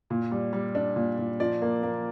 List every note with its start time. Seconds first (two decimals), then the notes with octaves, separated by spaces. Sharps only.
0.10 A#2
0.31 G3
0.53 G3
0.75 D4
0.96 A#2
1.18 A#2
1.40 F3 D5
1.62 A#3
1.83 A#3